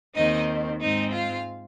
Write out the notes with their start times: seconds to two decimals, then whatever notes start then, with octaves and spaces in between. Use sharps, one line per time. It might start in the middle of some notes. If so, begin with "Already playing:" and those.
0.15 D#2 D#3 C4 D#4 D#5
0.80 G#2 G#3 C4 D#4 D#5
1.12 F4 F5